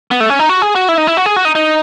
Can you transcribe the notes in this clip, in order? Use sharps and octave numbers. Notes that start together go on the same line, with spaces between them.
B3
A3
C#4
D#4
F#4
G#4
F#4
E4
D#4
E4
F#4
G#4
F#4
D#4
D#4